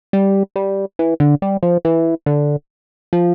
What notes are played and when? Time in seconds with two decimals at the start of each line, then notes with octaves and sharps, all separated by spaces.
0.13 G3
0.56 G3
0.99 E3
1.20 D3
1.42 G3
1.63 F3
1.85 E3
2.26 D3
3.13 F3